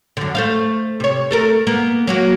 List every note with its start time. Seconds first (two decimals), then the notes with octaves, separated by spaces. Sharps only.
0.17 F#2 D3
0.35 A3 C5 F5
1.00 C3 C#5
1.31 A3 A4 A#4
1.67 A#3 B3
2.07 F#3 A#3 F#4